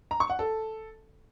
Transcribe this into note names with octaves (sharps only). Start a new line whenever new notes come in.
A#5
C#6
F#5
A4